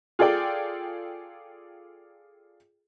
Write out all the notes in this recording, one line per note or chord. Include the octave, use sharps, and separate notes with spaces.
F4 G#4 A4 D5 G5